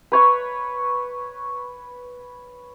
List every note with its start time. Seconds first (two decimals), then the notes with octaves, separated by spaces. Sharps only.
0.12 B4 C#5 C#6